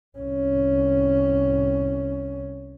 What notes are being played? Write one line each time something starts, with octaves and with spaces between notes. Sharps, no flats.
C2 C#4